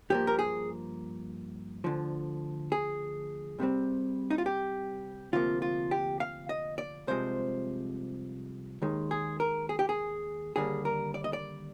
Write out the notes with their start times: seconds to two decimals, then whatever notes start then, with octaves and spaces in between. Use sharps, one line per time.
0.10 G2 F3 A#3 G4
0.27 A#4
0.39 G#4
1.84 D2 D3 F3
2.72 G#4
3.59 C2 C3 D#3 G3 C4
4.30 D#4
4.38 F4
4.46 G4
5.33 D2 C3 F3 A#3 F4
5.62 F4
5.91 G4
6.20 F5
6.49 D#5
6.78 D5
7.07 C2 C3 F3 G#3 C5
8.82 D#2 D#3 G#3
9.11 G#4
9.40 A#4
9.69 G#4
9.79 G4
9.89 G#4
10.56 D#2 D3 G3 A#3 G#4
10.85 A#4
11.14 D5
11.24 D#5
11.33 D5